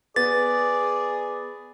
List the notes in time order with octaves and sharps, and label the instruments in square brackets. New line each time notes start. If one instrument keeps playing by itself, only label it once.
[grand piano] B3 [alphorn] G#4 [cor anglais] D5 [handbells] A6